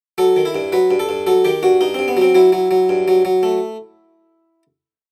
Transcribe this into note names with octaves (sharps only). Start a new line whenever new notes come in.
F#3 A4
D#3
E4
G2
F#3 B4
G2
A4
G2
F#3 A4
D#3 G4
G2 F#4
G2 D#4
G2 C4
B3
F#3 C4
F#3 E4
F#3
F#3
G2
F#3
F#3
A3